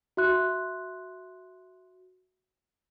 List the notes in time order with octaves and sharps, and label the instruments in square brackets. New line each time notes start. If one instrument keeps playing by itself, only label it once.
[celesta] F#4 E5 C6 F#6